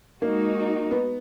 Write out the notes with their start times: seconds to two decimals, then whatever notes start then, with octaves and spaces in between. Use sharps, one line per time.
0.22 G#3 A#3 D#4 F#4
0.91 B3